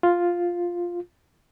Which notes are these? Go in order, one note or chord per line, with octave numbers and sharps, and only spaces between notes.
F4